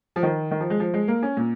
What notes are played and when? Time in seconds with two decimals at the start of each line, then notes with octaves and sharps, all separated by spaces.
0.16 F3
0.23 D#3
0.51 D#3
0.60 F3
0.70 G#3
0.80 F3
0.94 G#3
1.08 A#3
1.23 C#4
1.37 A#2